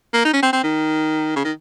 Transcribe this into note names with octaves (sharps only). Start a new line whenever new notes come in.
A#3
D#4
C#4
C4
C4
D#3
C#3
D#3